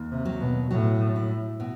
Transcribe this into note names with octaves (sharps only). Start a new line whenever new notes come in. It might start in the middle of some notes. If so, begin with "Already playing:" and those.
Already playing: D#2
C3
F#3
B2
A2 F#3
E4
B2